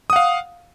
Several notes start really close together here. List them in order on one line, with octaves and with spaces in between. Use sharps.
D#6 F#5 F5